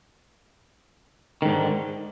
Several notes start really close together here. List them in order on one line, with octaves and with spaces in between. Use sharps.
D#3 G#2 D3